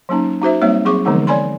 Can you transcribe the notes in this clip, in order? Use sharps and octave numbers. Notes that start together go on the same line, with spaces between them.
F#3 A#3 C#4 D#4
D#4 F#4 C5 E5
G3 A#3 C4 D#4 C#5 E5
F#3 C4 G#4 C#6 D6
D3 E3 F3 G#3 B3 D#4
C#5 D5 G#5 B5 C6